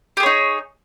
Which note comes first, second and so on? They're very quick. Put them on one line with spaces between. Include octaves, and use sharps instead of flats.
G4 G#4 C#5 D#4